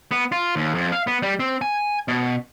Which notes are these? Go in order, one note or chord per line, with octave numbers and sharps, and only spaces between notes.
B3
F4
D#2
F2
F5
B3
G3
C4
G#5
B2